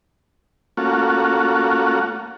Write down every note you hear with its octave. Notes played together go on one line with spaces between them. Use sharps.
A3 A#3 C#4 F4 F#4